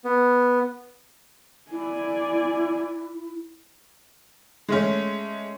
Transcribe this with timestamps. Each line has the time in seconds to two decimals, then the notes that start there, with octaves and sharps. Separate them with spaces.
0.04 B3
1.71 E4 D5 G#5
4.69 G#3 A3 C#4